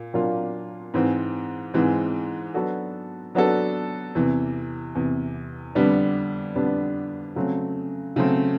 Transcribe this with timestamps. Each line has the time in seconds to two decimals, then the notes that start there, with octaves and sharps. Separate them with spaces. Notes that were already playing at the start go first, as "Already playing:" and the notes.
Already playing: A#2
0.13 A#2 F#3 A#3 D4 F4
0.94 G#2 E3 G#3 C4
1.74 G#2 E3 G#3 C4
2.54 F#3 B3 D4 F#4 A4
3.35 F#3 B3 D4 F#4 A4
4.15 E2 C3 E3
4.95 E2 C3 E3
5.75 F2 D3 G3 B3 D4
6.55 F2 D3 G3 B3 D4
7.36 C#3 F#3 A3 C4
8.16 C#3 F#3 A3 C4